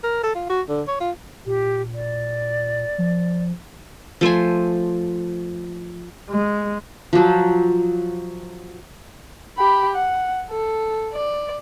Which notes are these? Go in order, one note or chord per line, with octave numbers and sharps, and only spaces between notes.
A#4
A4
F4
F#4
D3
C#5
F4
A#2 G4
D5
F3
F3 A3 C5 G#5
G#3
F3 F#3
G4 B5
F#5
A4
D5